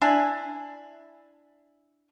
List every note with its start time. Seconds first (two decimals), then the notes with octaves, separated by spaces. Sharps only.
0.02 D4 E4 G#5